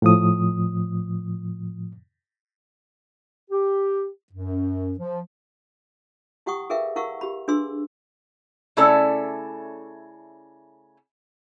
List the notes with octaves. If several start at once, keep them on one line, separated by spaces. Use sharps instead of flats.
A2 F3 D#6
G4
F#2
F3
E4 G4 F#5 G5 C#6 D#6
G#4 A#4 B4 E5 F5 G5
E4 A#4 F5 F#5 C#6 E6
G4 B5
D4 G#4 B4 C6 E6
C#3 A3 C#4 E4 A4 D5